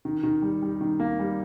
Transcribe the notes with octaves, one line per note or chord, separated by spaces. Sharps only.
D#3
D#3
G3
G3
D#3
A#3
G3